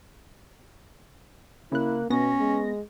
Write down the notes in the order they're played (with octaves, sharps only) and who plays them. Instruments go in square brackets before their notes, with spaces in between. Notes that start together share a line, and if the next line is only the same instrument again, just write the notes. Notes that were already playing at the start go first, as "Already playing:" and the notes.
[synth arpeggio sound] C#3 F#6 [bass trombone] A#3 [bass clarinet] E4
[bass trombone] B2 [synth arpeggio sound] B3 A#6 [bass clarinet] C#4
[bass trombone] G#3